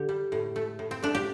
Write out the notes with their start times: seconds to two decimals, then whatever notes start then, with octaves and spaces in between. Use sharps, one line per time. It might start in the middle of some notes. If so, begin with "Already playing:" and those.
Already playing: D3 G4
0.09 G3
0.32 A2
0.56 A3
0.79 A2
0.91 C4
1.02 A3 D4
1.15 G4